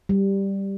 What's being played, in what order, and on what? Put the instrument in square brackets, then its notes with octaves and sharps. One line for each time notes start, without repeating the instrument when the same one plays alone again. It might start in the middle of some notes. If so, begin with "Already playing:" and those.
[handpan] G3